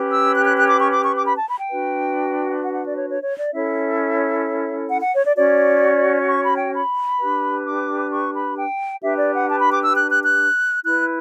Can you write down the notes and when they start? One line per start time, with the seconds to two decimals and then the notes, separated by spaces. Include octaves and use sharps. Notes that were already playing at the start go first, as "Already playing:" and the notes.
Already playing: C#4 G4 B4
0.11 E6
0.34 F#6
0.45 F#6
0.56 F#6
0.68 D6
0.79 C#6
0.90 D6
1.02 C#6
1.14 D6
1.25 B5
1.37 A5
1.48 B5
1.58 G5
1.70 D4 F#4 B4
2.62 F#5
2.73 F#5
2.84 D5
2.96 C#5
3.08 C#5
3.22 C#5
3.37 D5
3.53 C#4 E4 A4 C#5 E5
4.90 F#5
5.01 F#5
5.14 C#5
5.25 D5
5.35 C#4 F#4 C#5 D5
6.27 C#6
6.43 B5
6.57 G5
6.73 B5
7.19 D4 G4 B4
7.65 D6
8.10 C#6
8.33 B5
8.55 G5
9.02 D4 G4 B4 E5
9.16 D5
9.33 F#5
9.48 A5
9.59 B5
9.70 D6
9.82 E6
9.94 F#6
10.09 F#6
10.23 F#6
10.84 E4 B4 F#6